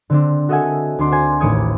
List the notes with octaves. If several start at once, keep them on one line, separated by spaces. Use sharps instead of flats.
D3 C4 D4
F#4 A4 D#5 E5 F#5 G#5
D2 D4 C6 D6
F#4 C5 G#5
A1 D#2 C#5 D6 D#6 G#6